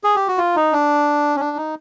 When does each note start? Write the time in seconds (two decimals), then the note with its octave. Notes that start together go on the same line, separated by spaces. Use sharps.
0.04 G#4
0.16 G4
0.28 F#4
0.38 F4
0.56 D#4
0.73 D4
1.36 C#4
1.40 D4
1.57 D#4